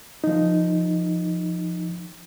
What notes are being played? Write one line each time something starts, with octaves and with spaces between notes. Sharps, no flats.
F3 D#4